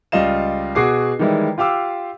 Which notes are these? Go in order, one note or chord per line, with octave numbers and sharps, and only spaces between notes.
C#2 G3 F4 D#5 F5 E7
B2 F#4 G#4 D6 C7
D#3 E3 G3 G#3 E4
F4 G4 F5 D6 E6